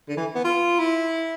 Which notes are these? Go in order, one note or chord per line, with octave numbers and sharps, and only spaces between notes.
D3
E3
B3
F4
E4